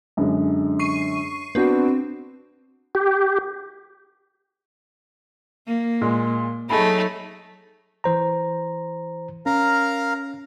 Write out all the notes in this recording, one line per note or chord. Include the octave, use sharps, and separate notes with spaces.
F#2 D3 G#3
C#6 C7 D#7
B3 C4 D4 F#4
G4
A#3
A#2 G#3
F#3 A3 D#4 G#4 B5
E3 C5 A#5
C#4 A#4 F5 A#5